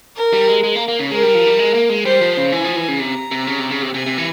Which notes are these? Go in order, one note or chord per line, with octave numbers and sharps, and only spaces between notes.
A#4
G3
G#3
G#3
A#3
A#3
C#3
G#3 A#4
G3
F3
G3
G#3
A#3
G#3
G3 C5
F3
C#3
E3 G#5
F3
E3
C#3
C3 A#5
C3
C#3
C3
C#3
C3
C3 G#5
C3
E3